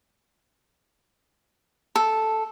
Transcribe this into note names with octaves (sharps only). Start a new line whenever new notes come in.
A4